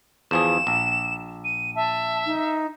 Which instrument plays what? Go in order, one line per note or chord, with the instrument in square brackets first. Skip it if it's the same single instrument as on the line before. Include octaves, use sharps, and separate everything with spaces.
[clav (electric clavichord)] E2 F3 G#4 [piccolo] E7
[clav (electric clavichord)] A#1
[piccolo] D#7
[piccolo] E5 [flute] A5
[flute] D#4